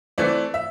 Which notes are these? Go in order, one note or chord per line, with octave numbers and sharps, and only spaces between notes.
E3 A3 C4 D5
E5